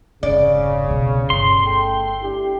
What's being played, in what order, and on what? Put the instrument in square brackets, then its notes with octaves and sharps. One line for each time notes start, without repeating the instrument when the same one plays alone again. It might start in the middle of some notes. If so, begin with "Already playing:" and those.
[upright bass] F1 G#2 [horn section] C#3 [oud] D5
[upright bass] C2 B2
[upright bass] G1 [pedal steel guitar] C6
[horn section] A3 A4 G5
D4 E4 G4